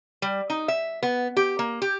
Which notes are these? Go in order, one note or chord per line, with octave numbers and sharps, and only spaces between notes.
G3
D#4
E5
B3
G4
A#3
G4